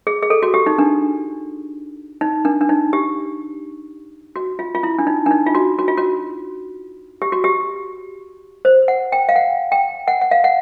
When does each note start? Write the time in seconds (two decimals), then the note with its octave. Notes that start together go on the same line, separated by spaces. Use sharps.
0.07 G#4
0.23 G#4
0.30 A4
0.43 F#4
0.54 G4
0.66 D#4
0.78 D4
2.21 D#4
2.45 D4
2.61 D4
2.69 D#4
2.93 G4
4.36 F#4
4.59 F4
4.75 F4
4.83 E4
4.99 D4
5.07 D#4
5.26 D4
5.31 D#4
5.46 F4
5.55 F#4
5.79 F#4
5.88 F4
5.98 F#4
7.22 G4
7.32 F#4
7.44 G4
8.65 C5
8.88 F#5
9.12 G5
9.29 F5
9.36 F#5
9.72 G5
10.08 F#5
10.21 F#5
10.31 F5
10.44 F#5